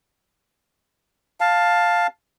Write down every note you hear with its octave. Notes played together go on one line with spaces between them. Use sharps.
F5 A5